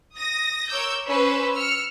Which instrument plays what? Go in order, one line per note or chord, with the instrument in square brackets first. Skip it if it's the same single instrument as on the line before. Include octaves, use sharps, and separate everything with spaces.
[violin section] D#6 A#6
A#4 C#5 D6 E6 G6
C#4 B4 C5 E6
E6 F6 C#7